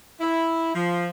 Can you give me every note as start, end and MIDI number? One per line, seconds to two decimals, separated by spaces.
0.20 0.73 64
0.75 1.08 53